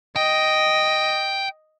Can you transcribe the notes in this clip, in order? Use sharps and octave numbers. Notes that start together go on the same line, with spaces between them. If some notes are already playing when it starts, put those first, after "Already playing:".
D#5 G5